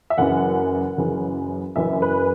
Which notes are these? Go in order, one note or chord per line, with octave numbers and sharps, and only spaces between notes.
E5
F#1 F#2 C#3 E3 F#5
F#1 F#2 C#3 E3
F#1 F#2 C#3 E3 E5
B4